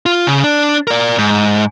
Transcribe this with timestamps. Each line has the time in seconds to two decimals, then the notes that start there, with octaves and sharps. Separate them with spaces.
0.06 F4
0.27 C#3
0.44 D4
0.87 A#4 D5
1.18 G#2